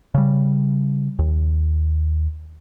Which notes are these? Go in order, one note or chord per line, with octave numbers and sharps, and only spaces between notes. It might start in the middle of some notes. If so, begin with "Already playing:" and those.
C#3 G3
D#2